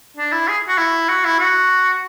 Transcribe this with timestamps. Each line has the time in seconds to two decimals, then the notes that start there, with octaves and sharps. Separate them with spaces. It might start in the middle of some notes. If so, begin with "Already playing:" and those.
0.17 D4
0.32 E4
0.48 G#4
0.68 F#4
0.78 E4
1.09 F#4
1.25 E4
1.39 F#4